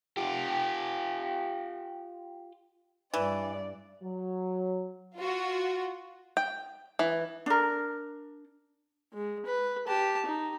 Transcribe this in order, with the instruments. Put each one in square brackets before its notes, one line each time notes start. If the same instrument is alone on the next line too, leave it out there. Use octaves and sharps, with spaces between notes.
[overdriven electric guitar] F4 G4
[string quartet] G2 D5 [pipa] E3
[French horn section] F#3
[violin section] F4 F#4
[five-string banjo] G5
E3
[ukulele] D4 A#4
[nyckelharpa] G#3
B4
G4 A5
D#4